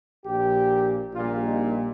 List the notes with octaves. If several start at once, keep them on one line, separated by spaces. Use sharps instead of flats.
A#1 A#2 F3 G4
A#1 A#2 G3 F4
D#4